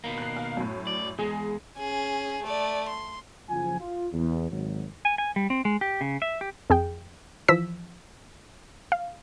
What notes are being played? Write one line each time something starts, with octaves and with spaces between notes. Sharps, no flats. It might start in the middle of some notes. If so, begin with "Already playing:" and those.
B2 D#3 A#3
F#6 C7
F5
F#2 A2
D5
E2 G#3 G#4
C#4 G#4
A3 D5
C6
F#1 F3 G#5
F4
E2
G#1 F#3
G#5
G#5
G3
C4
G#3
G4
C#3
E5
G4
F2 G#4 G5
E3 F3 E6 B6
F5